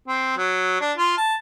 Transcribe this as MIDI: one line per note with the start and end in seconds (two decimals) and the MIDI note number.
0.08 0.33 60
0.37 0.78 54
0.81 0.92 62
0.98 1.13 65
1.17 1.35 81